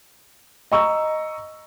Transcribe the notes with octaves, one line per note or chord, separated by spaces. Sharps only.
D#5 A#5 C#6 E6